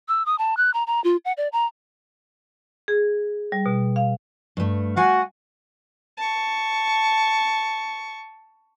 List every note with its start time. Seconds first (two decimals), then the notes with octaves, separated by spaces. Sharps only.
0.08 E6
0.26 D#6
0.38 A5
0.57 F#6
0.74 A#5
0.87 A#5
1.04 F4
1.25 F#5
1.37 D5
1.53 A#5
2.88 G#4
3.52 G3
3.66 B2
3.96 F5
4.57 G2 A3
4.96 F#4 F5 F#5 G#5
6.18 A5 C#6